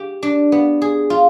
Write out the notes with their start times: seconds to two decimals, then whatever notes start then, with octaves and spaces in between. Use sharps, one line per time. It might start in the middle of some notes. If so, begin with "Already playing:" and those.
Already playing: G4
0.23 D4
0.52 B3
0.82 G#4
1.10 F4